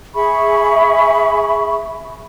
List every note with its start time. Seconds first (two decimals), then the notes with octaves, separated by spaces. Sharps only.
0.15 G#4 E5 B5 C#6